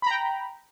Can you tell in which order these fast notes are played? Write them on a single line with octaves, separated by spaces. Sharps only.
B5 A#5 G5